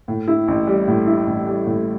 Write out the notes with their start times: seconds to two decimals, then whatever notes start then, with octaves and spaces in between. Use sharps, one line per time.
0.08 A2
0.28 E4
0.48 A1
0.67 G3
0.88 A2
1.07 E4
1.27 A1
1.47 G3
1.67 A2